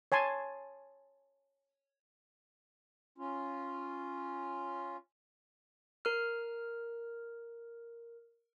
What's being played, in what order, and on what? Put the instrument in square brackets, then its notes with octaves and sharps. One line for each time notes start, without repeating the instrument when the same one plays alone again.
[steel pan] C#5 G#5 A5 C6
[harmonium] C#4 F4
[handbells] A#4 F6